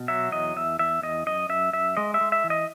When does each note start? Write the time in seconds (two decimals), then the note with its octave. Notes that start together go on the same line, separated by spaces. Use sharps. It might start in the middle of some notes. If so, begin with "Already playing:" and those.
Already playing: B2
0.08 F#3 E5
0.32 E2 D#5
0.56 E2 E5
0.79 E2 E5
1.02 E2 D#5
1.26 F#2 D#5
1.49 F#2 E5
1.73 F#2 E5
1.97 G#3 D#5
2.14 E5
2.21 G#3
2.32 E5
2.44 E3
2.50 D#5